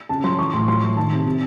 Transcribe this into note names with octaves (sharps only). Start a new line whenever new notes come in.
C#3 A5
F#3 C6
E3 C#6
A2 C6
F#3 C6
F#3
D#3 A5
C3
C3